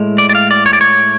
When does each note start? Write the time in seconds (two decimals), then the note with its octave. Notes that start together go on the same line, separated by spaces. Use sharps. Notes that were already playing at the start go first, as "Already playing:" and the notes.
Already playing: A2 G#3
0.18 D5
0.29 D5
0.35 F5
0.51 D5
0.66 C#5
0.73 D5
0.81 C#5